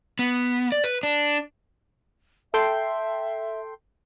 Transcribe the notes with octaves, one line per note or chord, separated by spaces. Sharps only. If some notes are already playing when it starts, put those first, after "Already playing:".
B3
D5
B4
D4
A4 E5 G5 C6